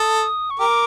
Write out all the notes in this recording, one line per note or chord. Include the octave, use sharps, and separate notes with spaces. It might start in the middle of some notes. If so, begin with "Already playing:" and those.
Already playing: A4 D#6
C#6
G4 A#4 D6